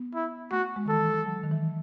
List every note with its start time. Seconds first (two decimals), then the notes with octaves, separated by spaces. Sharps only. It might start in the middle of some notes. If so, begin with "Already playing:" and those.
Already playing: B3
0.15 E4
0.51 A3 F#4
0.76 G#3
0.86 D#3
0.89 E3 A4
1.01 F#3
1.26 F#3
1.43 D#3
1.51 E3